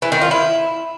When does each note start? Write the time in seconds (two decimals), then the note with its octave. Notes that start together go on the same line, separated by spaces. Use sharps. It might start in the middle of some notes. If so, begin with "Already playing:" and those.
0.02 E3
0.12 D#3
0.21 F4
0.31 E4